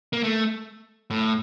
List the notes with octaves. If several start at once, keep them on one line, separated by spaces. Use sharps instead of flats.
A#3
A3
A2